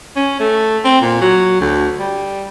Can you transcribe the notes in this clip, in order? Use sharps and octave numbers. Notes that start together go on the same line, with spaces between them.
C#4
A3
C4
A#2
F#3
D2
G3